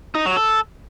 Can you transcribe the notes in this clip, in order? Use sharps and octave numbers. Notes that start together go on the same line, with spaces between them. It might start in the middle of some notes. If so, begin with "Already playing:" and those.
D#4
F#3
A4